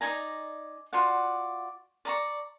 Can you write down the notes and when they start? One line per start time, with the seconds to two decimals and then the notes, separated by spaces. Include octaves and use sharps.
0.01 D#4 D5 G#5 A#5
0.93 F4 F#4 D5 F#5
2.05 D5 A#5 C#6